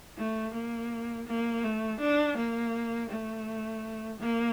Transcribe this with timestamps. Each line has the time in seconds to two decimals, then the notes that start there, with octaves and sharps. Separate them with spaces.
0.17 A3
0.54 A#3
1.27 A#3
1.64 A3
2.00 D4
2.37 A#3
3.10 A3
4.20 A#3